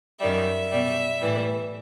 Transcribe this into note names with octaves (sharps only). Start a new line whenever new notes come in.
F#2 D#3 G3 E5
B2 G3
A2 E3 G3